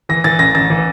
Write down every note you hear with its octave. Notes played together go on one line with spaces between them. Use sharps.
E3 A#6
E3 A6
A1 A#6
A1 A6
E3